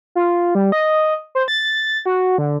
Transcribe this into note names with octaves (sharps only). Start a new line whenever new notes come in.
F4
G3
D#5
C5
A6
F#4
D3